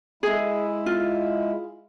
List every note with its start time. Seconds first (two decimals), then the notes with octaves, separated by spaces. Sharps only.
0.23 G#3 E4 G#4
0.86 F4